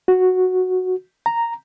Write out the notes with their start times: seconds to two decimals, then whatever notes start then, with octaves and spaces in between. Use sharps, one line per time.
0.08 F#4
1.26 A#5